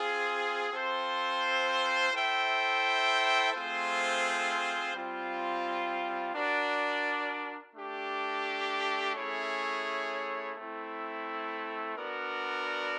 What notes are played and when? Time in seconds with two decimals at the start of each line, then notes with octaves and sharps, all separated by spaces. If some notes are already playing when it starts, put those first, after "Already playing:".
Already playing: C4 F4 G#4
0.73 C4 F4 A4 C5
2.13 E4 A4 C5 E5 G5
3.53 A3 C4 F4 G#4 C5
4.95 G3 C4 F4
6.35 D4 F#4 A#4 D5
7.75 A3 D4 G4
9.16 A3 C#4 E4 G#4 C#5
10.57 A3 C4 E4
11.97 B3 D4 F#4 A#4 D5